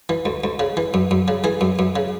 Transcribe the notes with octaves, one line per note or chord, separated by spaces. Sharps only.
E3
D2
D2
C#3
E3
F#2
F#2
C#3
E3 G#4
F#2
F#2
C#3